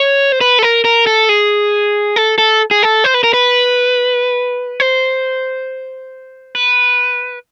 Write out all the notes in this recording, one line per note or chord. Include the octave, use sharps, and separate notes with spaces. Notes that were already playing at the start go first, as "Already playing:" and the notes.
Already playing: C#5
C5
B4
A4
A#4
A#4
A4
G#4
A4
A4
G#4
A4
C5
B4
A#4
B4
C5
B4